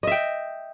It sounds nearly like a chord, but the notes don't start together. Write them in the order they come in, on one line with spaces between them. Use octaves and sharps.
D#5 E5 G5